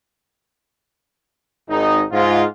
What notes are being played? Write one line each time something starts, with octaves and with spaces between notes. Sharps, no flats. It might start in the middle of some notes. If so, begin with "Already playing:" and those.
G#1 D#4
G#2 F4